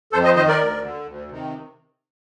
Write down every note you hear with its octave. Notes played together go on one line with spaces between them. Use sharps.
F2 A4 C5
C5 D#5
D#3 C5 D#5
A#4 D5
D2
D3
D2
C3 D#3